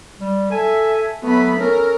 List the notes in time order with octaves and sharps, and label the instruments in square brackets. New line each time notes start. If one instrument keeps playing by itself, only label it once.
[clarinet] G3
[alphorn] A4 [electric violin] E5 [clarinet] G#5
[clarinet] F#3 [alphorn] A3 [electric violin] B3 B5
[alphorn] C#4 [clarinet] A4 [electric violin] A#4